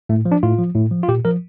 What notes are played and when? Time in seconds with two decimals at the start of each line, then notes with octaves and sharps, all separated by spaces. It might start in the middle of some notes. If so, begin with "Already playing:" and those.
0.09 A2 A3
0.25 F3
0.32 D4
0.43 A2 F4
0.59 F3
0.75 A2
0.91 F3
1.03 F4
1.09 A#2 G4
1.25 F3 A#4